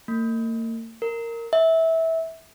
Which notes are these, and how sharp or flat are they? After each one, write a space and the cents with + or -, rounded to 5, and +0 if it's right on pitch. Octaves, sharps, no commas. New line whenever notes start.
A#3 -40
A#4 -10
E5 -20